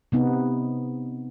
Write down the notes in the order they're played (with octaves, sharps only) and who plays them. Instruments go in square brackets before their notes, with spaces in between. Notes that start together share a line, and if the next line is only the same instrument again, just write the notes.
[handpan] C3 B3 D#4